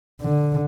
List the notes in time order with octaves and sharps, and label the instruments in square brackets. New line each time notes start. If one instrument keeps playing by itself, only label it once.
[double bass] D3